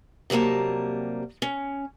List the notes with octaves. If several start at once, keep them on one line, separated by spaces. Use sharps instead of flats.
C3 F#3 G3 A#3 A5
C#4